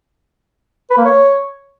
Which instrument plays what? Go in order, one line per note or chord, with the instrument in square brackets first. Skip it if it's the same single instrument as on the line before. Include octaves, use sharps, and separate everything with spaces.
[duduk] B4
A#3
C#5